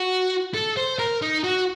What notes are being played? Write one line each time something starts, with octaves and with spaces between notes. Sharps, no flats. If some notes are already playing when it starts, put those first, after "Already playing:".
Already playing: F#4
A4
C5
A#4
D#4
F#4